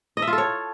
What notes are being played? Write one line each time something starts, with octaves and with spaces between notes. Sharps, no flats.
D#5
E5
F4
A4
C#5